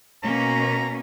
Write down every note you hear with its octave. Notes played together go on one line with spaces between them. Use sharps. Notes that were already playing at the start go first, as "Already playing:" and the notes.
B2 A#3 C#4 A#5